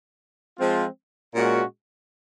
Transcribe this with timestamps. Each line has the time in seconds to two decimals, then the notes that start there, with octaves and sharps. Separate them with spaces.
0.57 F3 G#3 C4 F4
1.35 A#2 G#3 C#4 F#4